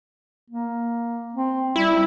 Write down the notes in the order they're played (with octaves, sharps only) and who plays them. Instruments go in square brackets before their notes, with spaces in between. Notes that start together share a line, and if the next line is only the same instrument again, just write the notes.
[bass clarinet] A#3
C4
[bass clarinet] G3 [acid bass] E4